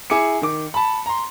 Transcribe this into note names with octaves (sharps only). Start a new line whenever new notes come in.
E4 G#4 G#5 D6 C#7
D#3 D6
A5 B5
A#5 C6